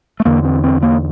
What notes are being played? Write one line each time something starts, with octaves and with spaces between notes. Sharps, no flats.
A3
E2 D3 A#3
C4
C4
A#3